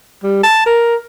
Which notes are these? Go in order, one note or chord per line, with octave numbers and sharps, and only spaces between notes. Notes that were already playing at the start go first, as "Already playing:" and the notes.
G3
A5
A#4